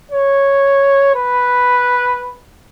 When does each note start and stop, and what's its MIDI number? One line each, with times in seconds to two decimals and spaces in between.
0.11 1.12 73
1.15 2.41 71